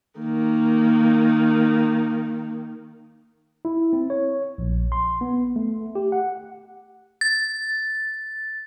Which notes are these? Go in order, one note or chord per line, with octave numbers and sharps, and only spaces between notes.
D#3 A#3
E4
C4
C#5
A#1
C6
B3
A3
G4
F#5
A6